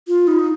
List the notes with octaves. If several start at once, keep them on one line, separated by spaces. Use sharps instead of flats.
F4
D#4